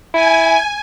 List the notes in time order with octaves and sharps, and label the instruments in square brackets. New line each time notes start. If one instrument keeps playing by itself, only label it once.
[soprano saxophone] E4 [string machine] G#5